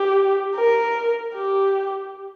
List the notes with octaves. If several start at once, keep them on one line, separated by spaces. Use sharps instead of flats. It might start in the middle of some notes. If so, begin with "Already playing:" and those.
Already playing: G4
A#4
G4